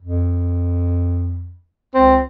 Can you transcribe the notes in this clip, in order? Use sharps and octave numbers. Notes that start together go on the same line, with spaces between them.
F2
C#2 C4